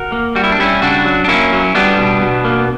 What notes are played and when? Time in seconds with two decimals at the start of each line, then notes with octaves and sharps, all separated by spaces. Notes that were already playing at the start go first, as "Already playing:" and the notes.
Already playing: F#4 A#4
0.12 A#3
0.35 G3 F#4
0.44 E4
0.52 D4
0.59 G3 C#4 E4
0.82 C#3 D4 F#4
1.05 F#3
1.24 D4
1.28 A#3 C#4 E4
1.52 F#3
1.75 G3 B3 D4
1.99 B2
2.22 B2
2.44 A#3